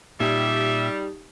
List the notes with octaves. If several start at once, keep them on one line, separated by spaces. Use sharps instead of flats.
A#2 G3 D#4 G4 E5 D#6